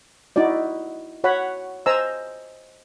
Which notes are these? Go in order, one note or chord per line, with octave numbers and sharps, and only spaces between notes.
D#4 E4 F#4 D5
F#4 C#5 F#5 B5
C5 D#5 G#5 A#5 E6